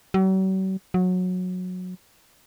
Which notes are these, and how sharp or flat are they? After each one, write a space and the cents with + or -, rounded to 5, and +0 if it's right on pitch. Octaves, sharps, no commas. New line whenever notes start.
F#3 +45
F#3 -20